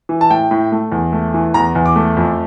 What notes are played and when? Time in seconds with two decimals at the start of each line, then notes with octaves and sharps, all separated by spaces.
0.09 E3
0.21 A5
0.30 A2 G5
0.51 A2
0.72 A3
0.92 E2
1.13 A3
1.34 E3
1.54 E2 A#5
1.75 E2
1.86 D6
1.96 A3
2.17 F2